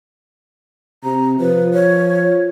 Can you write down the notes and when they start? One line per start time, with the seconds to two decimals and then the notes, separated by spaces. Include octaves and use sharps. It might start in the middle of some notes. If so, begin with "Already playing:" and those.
1.04 C3 A#5
1.40 F3 B4
1.74 C#5